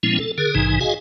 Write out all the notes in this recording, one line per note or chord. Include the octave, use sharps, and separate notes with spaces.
A#2 F3 G#3 B3 C#4 E4
A4
D3 G#4 A#4
A#1 G#2 C3 E3 D#4 G#5
F#4 G#4 D#5 F5 G#5